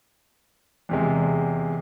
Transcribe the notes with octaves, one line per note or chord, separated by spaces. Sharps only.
E2 C3 G#3